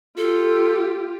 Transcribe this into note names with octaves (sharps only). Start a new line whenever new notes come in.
F4 G4 A4